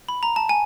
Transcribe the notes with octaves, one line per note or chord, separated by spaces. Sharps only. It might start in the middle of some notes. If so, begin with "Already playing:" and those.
B5
A#5
A5
G#5